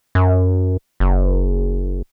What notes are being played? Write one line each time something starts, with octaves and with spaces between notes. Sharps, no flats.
F#2
F#1